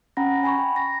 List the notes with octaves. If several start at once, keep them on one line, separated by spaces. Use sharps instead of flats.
C#4 F#5 G5 A#5 B5 A#6
G#5 B5 C#6
G5
A#6